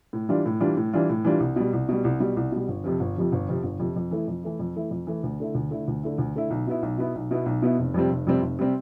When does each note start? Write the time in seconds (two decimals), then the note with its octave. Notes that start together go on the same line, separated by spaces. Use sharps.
0.13 A2
0.29 E3 G3 D4 F4
0.46 A2
0.61 E3 G3 D4 F4
0.77 A2
0.93 E3 G3 D4 F4
1.09 A2
1.25 E3 G3 D4 F4
1.40 C2
1.56 B2 G3
1.73 C2
1.89 B2 G3
2.05 C2
2.20 B2 G3
2.37 C2
2.52 B2 G3
2.68 G1
2.84 F2 C3 F3
3.00 G1
3.16 F2 C3 F3
3.32 G1
3.49 F2 C3 F3
3.63 G1
3.80 F2 C3 F3
3.96 F2
4.11 E3 A3 E4
4.28 F2
4.43 E3 A3 E4
4.60 F2
4.76 E3 A3 E4
4.91 F2
5.07 E3 A3 E4
5.24 D2
5.40 D3 A3 E4
5.55 D2
5.71 D3 A3 E4
5.88 D2
6.03 D3 A3 E4
6.18 D2
6.36 D3 A3 E4
6.50 B1
6.67 B2 B3 E4
6.83 B1
6.98 B2 B3 E4
7.15 B1
7.31 B2 B3 E4
7.46 B1
7.62 B2 B3 E4
7.79 F1
7.94 F2 C3 G3 C4
8.10 F1
8.27 F2 C3 G3 C4
8.42 F1
8.59 C3 G3 C4